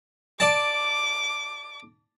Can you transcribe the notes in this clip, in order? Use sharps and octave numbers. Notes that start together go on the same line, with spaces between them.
D5 A5 D6